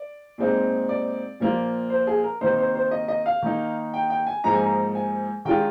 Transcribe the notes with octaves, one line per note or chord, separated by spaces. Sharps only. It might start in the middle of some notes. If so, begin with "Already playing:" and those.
Already playing: D5
A#2 G#3 C4 D#4
D5
A#2 F3 A#3 F4
C5
G#4
A#4
C3 D#3 A#3 D#4 C5
C5
C5
D#5
D#5
F5
D#3 A#3 D#4
G5
G5
G#5
G#2 F3 A#3 D#4 A#5
G#5
A#5
G#5
D#3 G#3 D4 F4 G5